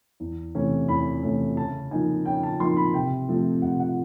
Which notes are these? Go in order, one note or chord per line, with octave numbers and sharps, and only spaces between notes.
E2
C3 E3 A3 C#4
E2 B5
C3 E3 A3 C#4
C#3 A5
F3 A#3 D#4 G#5
C#3 G5
A5
F3 A#3 D#4 C6
B5
C3 G5
F3 A3 C4
C3 F#5
F#5